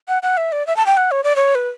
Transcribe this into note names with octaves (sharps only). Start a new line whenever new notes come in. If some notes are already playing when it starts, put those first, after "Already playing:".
F#5
F#5
E5
D5
E5
A5
G5
F#5
C#5
D5
C#5
B4